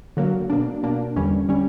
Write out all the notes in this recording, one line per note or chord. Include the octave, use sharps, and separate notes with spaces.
D3 F#3 A#3
B2 A#3 D4
B2 A#3 D4
E2 D3 G3 C#4
D3 G3 C#4